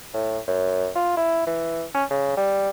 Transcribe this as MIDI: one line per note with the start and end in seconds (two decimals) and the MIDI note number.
0.14 0.39 45
0.48 0.88 42
0.95 1.15 65
1.17 1.44 64
1.47 1.84 52
1.95 2.04 61
2.10 2.33 49
2.37 2.69 55